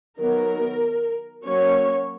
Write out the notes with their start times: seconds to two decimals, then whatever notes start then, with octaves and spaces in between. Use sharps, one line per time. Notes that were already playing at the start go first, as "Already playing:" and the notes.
0.18 D#3 F#3 B3 A#4
1.45 F#3 A#3 C#4 C#5